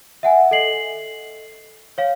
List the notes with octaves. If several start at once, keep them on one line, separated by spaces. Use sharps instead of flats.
E5 F#5 G#5
A4 D#5 C7 F#7
C#5 F5